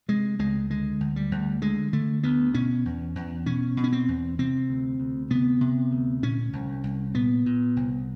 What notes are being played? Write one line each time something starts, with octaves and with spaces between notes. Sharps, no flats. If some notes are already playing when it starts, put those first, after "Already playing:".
C3 G#3
C#2 G#3
D3 G#3
D2
G3
D2
D3 G#3
D3 A3
D2 B3
B2 C#4
E2
E2
B2 C#4
B2
C#4
C4
E2
C3 C4
D2
D2
C3 B3
C3
D2
A#2 C#4
C2
C2
A#2 B3
A#2
C2